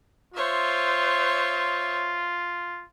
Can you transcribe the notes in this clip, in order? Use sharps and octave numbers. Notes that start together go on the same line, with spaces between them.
F4 C5 C#5 E5